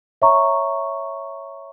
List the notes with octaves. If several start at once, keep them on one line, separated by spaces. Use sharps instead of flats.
C#5 E5 A#5 C#6